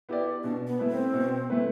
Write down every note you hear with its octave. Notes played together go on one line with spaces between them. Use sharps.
B3 E4 G4 D5
B2 D4
B3
A3 E4 B4
C4
B2
A3 E4 B4